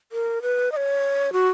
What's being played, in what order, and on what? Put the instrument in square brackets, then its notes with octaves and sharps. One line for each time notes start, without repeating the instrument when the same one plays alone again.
[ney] A#4
B4
D#5
C#5
F#4